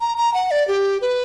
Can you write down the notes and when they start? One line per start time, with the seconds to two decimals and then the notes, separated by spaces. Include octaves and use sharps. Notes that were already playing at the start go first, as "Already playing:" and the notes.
0.01 A#5
0.17 A#5
0.34 F#5
0.51 D5
0.68 G4
1.01 B4